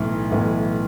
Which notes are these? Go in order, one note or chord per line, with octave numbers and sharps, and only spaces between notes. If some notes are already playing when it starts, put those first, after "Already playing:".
Already playing: B1 A2 E3
B1 A2 E3